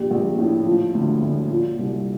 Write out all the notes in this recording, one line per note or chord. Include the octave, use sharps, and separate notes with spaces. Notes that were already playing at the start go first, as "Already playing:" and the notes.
Already playing: A#1 G4
A#1
A2
F3
D2
D2
A#2
C2